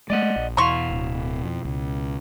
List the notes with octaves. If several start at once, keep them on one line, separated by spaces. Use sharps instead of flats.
G#3 A3 D5 D#5 F#5
A#1
E2 B2 E4 F5 A#5 C6 C#6
D1
F2
C#2